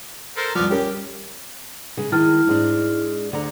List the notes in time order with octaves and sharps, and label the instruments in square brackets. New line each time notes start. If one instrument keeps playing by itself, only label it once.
[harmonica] A4 A#4 C5
[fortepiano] C2 F3 [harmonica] B3 D5 F6
[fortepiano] G3 C#4 A#4 [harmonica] G4
[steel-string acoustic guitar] C#3 G#3
[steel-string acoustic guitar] D#3 G#3 [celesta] E4 F6
[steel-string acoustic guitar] G#2 G#3 D4
D2 D3 A#5